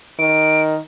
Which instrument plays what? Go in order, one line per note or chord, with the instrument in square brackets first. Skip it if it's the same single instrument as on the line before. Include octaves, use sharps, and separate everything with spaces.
[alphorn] D#3 [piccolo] D7